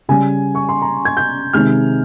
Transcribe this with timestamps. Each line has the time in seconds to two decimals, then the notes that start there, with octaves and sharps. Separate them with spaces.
0.08 C#3 G3 G#5
0.55 C#6
0.69 C6
0.82 A#5
1.05 G#6
1.17 G6
1.53 C3 D#3 G#3 F6